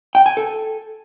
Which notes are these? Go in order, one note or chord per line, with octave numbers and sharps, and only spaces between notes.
G5
G#5
A4